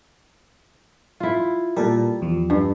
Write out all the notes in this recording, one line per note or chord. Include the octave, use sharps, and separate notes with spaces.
E4 F4
A#2 G3 A4 A#4
E2 F3
G2